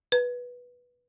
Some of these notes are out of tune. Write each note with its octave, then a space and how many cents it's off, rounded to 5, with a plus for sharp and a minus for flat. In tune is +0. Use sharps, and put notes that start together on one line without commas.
B4 -10